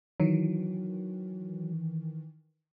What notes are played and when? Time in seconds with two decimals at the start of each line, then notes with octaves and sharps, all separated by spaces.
0.20 D#3 E3 F#3